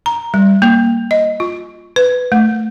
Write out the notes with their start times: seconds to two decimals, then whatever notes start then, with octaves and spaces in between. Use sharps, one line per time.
0.06 A#5
0.34 G3
0.62 A#3
1.11 D#5
1.40 F4
1.96 B4
2.32 A3